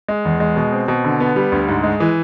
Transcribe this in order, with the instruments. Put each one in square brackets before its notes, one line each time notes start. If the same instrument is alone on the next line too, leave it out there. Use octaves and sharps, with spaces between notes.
[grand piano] G#3
E2
G#3
B2
C4
B2
D3
B3
G3
D2
G#2
G#3
E3